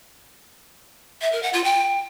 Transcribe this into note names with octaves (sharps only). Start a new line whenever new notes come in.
E5
A#4
F#5
F4
G5